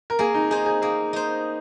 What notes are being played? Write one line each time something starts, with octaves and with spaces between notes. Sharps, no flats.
A#4
A#3 G#4
D#4
D#4 G#4 C5
G#4
A#3 G#4
D#4 C5